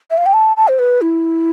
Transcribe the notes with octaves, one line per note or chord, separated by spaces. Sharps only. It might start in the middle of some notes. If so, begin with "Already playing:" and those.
E5
F5
G5
A5
A5
C5
B4
E4